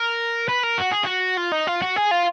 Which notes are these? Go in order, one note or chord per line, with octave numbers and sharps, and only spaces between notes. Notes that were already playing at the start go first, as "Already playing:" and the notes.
Already playing: A#4
B4
A#4
F#4
G#4
F#4
F4
D#4
F4
F#4
G#4
F4